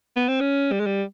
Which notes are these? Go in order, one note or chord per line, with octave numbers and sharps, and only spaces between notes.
B3
C4
C#4
G3
G#3
G3